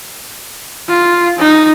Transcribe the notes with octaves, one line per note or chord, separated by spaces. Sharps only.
F4
D#4